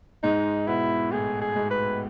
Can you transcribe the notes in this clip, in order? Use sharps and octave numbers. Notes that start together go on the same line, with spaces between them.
G#2 G#3 D#4
B2 B3 E4
A2 A3 G#4
G#4
G#2 G#3
B4